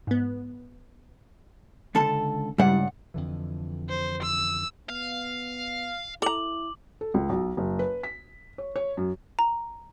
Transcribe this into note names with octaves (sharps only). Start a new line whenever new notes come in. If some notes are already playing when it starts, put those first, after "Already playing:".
G#2 B3
C#2 D3 A4 A5
C#2 G2 G3 D4 E4 F#5
F2 D3 E3
C5
E6
B3 F5
E4 A4 A#5 D6 F#7
A4
C#2
B1
F#1
B4
B6
C#5
C#5
F#2
A#5